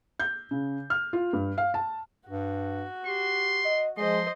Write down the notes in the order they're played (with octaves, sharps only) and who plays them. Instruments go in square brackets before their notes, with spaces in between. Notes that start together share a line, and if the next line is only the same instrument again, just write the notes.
[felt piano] G6
C#3
F6
F4
G2
F5
A5
[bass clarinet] G2 [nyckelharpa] F#4
[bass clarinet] G4 [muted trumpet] C6
[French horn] D#5
[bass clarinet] F3 [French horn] G#3 [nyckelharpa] C5 D#5 [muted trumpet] C6